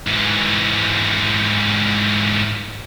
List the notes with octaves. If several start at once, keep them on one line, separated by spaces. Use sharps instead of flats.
G#2 E3